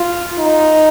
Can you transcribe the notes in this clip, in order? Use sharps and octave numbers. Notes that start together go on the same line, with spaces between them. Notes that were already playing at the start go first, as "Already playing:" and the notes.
Already playing: F4
D#4